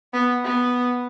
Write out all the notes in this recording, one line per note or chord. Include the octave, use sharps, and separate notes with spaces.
B3
B3